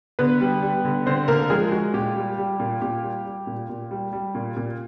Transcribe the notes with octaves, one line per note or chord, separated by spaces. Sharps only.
D3 B3 B4
G3
G3
D3
D3 C4 C5
D3 A#3 A#4
A4
F3 G#3 G#4
G#3 F#4
A#2 G4
G3
G3
A#2
A#2 G4
G3
G3
A#2
A#2
G3
G3
A#2
A#2